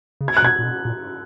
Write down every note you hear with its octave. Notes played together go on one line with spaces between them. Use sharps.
C#3
G#6
F#6
B2 G#6
A#2
B2
A#2